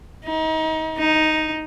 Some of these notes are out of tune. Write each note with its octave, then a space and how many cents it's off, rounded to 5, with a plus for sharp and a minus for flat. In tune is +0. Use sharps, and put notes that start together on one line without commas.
D#4 +30
D#4 +0